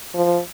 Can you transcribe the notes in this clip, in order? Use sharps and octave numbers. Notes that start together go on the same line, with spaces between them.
F3